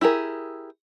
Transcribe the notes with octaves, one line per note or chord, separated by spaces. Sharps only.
E4 G4 G#4 A#4